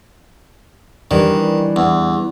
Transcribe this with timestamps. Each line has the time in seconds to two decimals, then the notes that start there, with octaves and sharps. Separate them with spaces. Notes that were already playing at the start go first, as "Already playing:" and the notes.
1.11 D#3 E3 G3 D4
1.76 E2